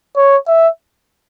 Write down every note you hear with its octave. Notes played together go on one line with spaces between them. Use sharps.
C#5
E5